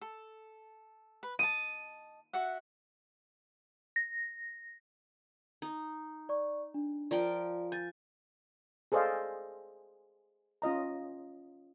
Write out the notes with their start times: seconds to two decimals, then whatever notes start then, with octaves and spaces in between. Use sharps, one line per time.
0.01 A4
1.23 B4
1.39 D#5 A5 D#7
2.33 F#4 E5 F#5
3.96 A#6
5.62 D#4
6.29 D5 C#6
6.74 D4
7.11 F3 A#4 D5 G5
7.72 G#5 G6 A6
8.92 G#4 A4 C5 D5 D#5 F5
10.62 C#4 F4 D#5 A#5